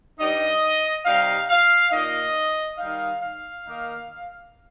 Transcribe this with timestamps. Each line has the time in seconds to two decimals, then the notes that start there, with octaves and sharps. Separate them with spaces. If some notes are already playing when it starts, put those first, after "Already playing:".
0.19 G2 G3 D#4 D#5
1.06 C3 G3 D#4 F5
1.49 F5
1.92 A#2 A#3 D#4 D#5
2.78 D#3 G3 D#4 F5
3.21 F5
3.64 D#3 A#3 D#4